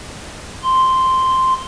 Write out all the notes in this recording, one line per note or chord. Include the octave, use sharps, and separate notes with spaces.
C6